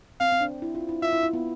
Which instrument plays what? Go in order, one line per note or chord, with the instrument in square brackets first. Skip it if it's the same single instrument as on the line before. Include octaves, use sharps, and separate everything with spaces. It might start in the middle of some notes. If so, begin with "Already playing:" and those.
[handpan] C4 [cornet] F5
[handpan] C4
D4
E4
F4
E4
[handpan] F4 [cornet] E5
[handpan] E4
E4
B3